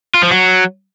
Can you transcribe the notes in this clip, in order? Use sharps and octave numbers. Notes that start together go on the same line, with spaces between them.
F4
F3
F#3